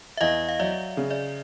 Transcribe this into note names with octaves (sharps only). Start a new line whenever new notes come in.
E5
E2 D#5 F5
F5
F#3 D5 E5
C#3
D5 E5